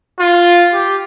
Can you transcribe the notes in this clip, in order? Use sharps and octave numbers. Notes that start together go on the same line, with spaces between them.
F4
G4